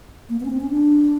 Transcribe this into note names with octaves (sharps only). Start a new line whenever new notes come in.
A#3
B3
C#4
C4
C#4
D4